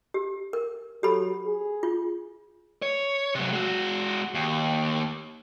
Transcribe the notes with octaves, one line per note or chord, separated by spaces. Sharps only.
G4
A#4
F#3 G4 A4 B5
G#4
F4
C#5
C3 F#3
G#3 F#4
D#2